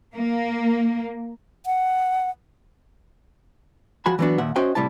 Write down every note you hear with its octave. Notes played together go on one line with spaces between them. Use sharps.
A#3
F#5
F3 F#4 G#5 B5
E3 F#3 B3 C4 D4 F#4
D#2 A#2 E5 F#5
C#4 F#4 C5 D#5 E5 G5
A2 C3 G3 E4 G4 A5